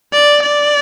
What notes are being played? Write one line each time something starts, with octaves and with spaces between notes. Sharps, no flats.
D5
D5